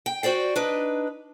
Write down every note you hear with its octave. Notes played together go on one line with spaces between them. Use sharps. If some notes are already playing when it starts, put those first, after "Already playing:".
G5
F#4 C5 D5 G5
D4 D#4 B4